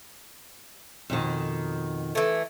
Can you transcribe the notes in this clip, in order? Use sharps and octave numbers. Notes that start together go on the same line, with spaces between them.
F2 B2 D#3
E3 A3